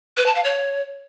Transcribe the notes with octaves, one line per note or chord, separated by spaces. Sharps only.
B4
A5
F5
C#5